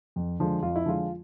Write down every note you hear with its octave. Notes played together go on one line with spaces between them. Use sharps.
F2
D3 F3 G#3
F2 F4
E4
D3 F3 G#3 F4